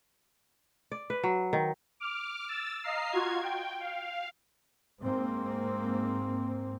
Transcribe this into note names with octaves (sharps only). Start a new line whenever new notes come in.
D5
B4
F#3
D#3
D6 F6
E6 A6
D#5 F5 A#5 C7
F4 F#4 G#6
G5
F5
G#2 A#3 C4